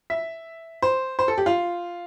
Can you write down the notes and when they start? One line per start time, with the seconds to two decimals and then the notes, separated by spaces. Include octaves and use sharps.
0.10 E5
0.82 C5
1.19 C5
1.28 A4
1.38 G4
1.46 F4